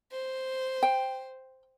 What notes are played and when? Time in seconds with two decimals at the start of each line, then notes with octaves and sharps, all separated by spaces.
0.12 C5
0.83 G5